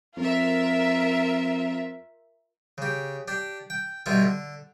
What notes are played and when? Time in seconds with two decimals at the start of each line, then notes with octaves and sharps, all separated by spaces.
0.17 F2 F4 A#4 E5
2.78 C#3 G4
3.28 D4 G4
3.70 G5
4.06 B2 D3 G3 E4 F4
4.22 D3